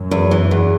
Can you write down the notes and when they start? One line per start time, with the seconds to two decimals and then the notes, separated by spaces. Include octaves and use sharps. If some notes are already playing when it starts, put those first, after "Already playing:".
Already playing: F#2
0.11 E2
0.31 E3
0.51 E2